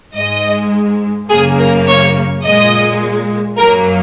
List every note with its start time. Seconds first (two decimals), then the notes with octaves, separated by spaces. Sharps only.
0.16 G#2 G#3 D#5
1.30 F#2 C#3 A#3 G#4
1.59 A#4
1.87 C#5
2.44 A#2 G#3 D#5
3.58 F#2 F#3 A#3 A#4